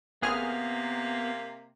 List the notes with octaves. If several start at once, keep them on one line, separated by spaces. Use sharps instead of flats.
A1 C3 A#3 B3 G#4 F6